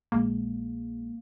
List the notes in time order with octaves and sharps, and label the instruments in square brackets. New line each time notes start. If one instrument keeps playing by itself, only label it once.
[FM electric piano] A#1 G#3 [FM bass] A#3